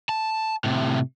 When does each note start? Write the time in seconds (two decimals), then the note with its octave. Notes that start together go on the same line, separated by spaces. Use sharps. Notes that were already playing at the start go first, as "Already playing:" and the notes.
0.09 A5
0.64 A2 C3